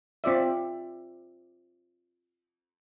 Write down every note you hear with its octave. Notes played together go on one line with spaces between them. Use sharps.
C4 F4 D5 E5